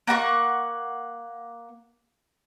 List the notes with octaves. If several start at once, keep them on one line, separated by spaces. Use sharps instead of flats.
A#3 F#5 A#5 C#6